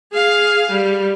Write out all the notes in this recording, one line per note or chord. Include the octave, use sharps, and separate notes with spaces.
G#4 F5
G3